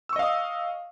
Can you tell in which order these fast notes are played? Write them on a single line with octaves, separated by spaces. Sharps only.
E6 C#6 D#5 F5 D#6